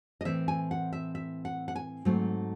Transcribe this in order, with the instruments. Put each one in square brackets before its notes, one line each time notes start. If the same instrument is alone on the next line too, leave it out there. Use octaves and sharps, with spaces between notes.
[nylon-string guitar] D#5
A2 E3 C4 E5
G#5
F#5
E5
E5
F#5
F#5
G#5
G#2 F#3 A3 C4